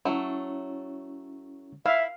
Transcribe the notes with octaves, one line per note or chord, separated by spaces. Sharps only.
F#3 A3 C#4 E4
E4 E5 F5